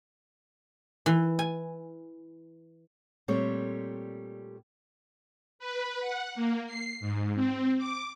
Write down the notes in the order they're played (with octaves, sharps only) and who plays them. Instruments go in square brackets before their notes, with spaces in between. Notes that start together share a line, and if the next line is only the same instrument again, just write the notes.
[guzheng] E3
G#5
[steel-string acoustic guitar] A#2 G3 A3 C4 C#5
[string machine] B4
F#5
A#3
C7
G#2
C4
D6